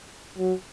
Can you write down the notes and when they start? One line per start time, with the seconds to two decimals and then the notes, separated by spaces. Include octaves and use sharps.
0.38 F#3